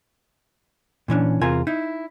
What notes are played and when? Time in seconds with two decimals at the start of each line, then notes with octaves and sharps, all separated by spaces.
1.08 A#2 E3 C#4 D4
1.41 E2 C3 F4 A#4 G#5
1.67 D#4 E4